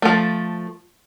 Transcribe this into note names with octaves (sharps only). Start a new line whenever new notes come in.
F3 A3